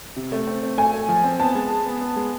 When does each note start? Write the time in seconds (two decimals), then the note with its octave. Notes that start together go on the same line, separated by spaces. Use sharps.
0.16 C3
0.32 A3
0.47 C4
0.63 A3
0.78 A3 G#5
0.93 A3
1.09 F3
1.24 C4
1.40 B3 A5
1.55 G#3
1.70 G#4
1.86 B3
2.01 B3
2.16 G#3